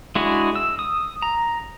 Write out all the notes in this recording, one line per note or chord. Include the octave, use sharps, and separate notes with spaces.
G#3 D4 E4 F#4 G#4
E6
D#6
A#5